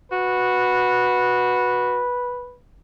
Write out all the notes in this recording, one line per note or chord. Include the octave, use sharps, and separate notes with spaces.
F#4 B4